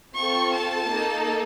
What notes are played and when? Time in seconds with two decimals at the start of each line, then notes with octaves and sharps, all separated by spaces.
0.15 C4 F4 A4 C#6
0.52 A5
0.90 A#3 D#4 A4